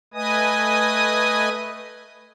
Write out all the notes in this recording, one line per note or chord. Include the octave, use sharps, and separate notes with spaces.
A3 B4 D#5 G#5 D#6